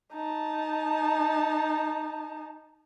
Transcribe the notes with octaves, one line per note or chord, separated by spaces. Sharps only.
D#4 A5